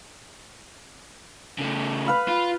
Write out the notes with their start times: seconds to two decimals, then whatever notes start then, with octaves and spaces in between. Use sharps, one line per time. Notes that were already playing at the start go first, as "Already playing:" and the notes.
1.58 C#3 A3
2.06 B4 F5 B5
2.28 F4